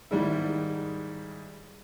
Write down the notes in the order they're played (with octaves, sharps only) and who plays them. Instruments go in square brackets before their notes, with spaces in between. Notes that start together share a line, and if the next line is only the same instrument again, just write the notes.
[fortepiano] G#2 D#3 G3 G#3 E4